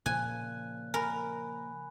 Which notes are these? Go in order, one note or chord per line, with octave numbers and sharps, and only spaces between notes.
A#2 C#3 F3 G#5 F#6
A#4 G#5 B5